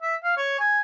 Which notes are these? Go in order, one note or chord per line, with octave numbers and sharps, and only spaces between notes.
E5
F5
C#5
G#5